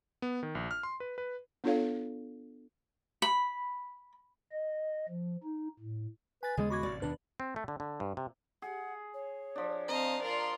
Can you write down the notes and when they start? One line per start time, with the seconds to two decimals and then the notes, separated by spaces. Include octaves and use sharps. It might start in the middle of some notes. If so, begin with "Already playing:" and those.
0.22 B3
0.43 D#3
0.55 A#1
0.71 F6
0.83 C6
1.00 B4
1.18 B4
1.64 B3 D4 F4 A4 C#5 F5
3.22 B5
4.52 D#5
5.09 F3
5.43 D#4
5.79 A2
6.43 B4 G#5 A6
6.57 D#2 C#3 G#3 B3 G#4
6.70 F#4 B5 D6 G#6
6.83 A1 C3 D5
7.02 D#2 B2 D#3 D4 B4
7.40 C4
7.56 A3
7.68 D3
7.80 D3
8.00 G2
8.17 C3
8.62 G#4 F#5
9.14 C#5
9.56 F3 D4
9.88 C4 D#5 F5 A5 A#5
10.22 F4 A#4 D5 C6